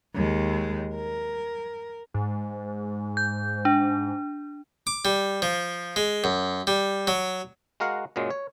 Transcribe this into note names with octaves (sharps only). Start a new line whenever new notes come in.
D#2 G#3
A#4
G#2
G6
D4
D6
G3
F3
G#3
F#2
G3
F#3
G#3 F#4 A#4 F5 F#5
F#2 A#2 F#3 G#3
C#5